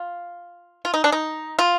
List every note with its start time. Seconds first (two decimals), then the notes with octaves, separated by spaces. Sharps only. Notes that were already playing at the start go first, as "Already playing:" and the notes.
Already playing: F4
0.85 F4
0.94 D#4
1.04 D4
1.12 D#4
1.59 F4